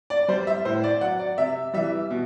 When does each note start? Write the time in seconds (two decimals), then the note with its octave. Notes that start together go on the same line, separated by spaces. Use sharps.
0.10 D5
0.28 G3 C5
0.47 E5
0.65 A2 C5
0.84 D5
1.01 F#3 F#5
1.20 D5
1.38 C3 E5
1.74 E3 G3 E5
2.11 B2